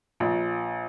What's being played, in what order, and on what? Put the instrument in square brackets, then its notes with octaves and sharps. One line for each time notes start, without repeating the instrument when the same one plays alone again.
[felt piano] A#1